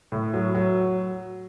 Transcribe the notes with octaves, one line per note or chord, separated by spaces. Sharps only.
A2
F#3
F#3